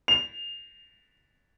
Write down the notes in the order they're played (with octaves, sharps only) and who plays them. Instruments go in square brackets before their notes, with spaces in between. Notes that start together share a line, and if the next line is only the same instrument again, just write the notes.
[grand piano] F7